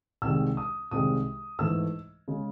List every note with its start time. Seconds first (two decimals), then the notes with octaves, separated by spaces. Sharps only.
0.22 C2 C3 D#3 G#3 E6
0.57 D#6
0.91 C2 C3 D#3 G#3 D#6
1.59 G#2 E3 A3 E6
2.28 C#3 G#3